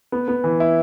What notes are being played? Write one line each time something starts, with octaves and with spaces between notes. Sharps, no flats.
B3
B3
E3
E4